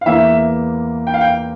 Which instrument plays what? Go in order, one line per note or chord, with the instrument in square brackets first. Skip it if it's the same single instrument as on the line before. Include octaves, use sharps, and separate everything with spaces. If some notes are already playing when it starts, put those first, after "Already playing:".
[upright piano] F5
E2 E3 A#3 E5
G5
F5
G5